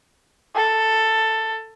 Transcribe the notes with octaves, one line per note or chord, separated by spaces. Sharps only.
A4